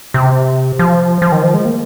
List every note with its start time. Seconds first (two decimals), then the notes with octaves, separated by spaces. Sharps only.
0.14 C3
0.79 F3
1.22 F3
1.32 D#3
1.43 F3
1.54 G#3
1.65 A#3